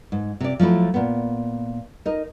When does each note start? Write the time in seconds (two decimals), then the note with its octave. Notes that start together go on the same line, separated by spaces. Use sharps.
0.12 G#2
0.41 C3 D5
0.60 F3 F#3 A3 E4
0.94 A#2 B3
2.06 D#4 A#4 D#5